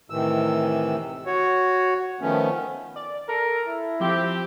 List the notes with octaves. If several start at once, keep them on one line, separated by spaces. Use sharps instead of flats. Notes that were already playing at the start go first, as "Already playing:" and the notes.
A2 C3 D#3 E3 E6
F#4 C#5
D#3 F3 A3 B3 C#4
D5
A4 A#4
E4
F3 C4 G4